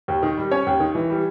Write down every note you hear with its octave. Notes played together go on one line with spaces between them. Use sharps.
D#2
D#3
G3
C#4 C#5
D#2
D#3
E3
G3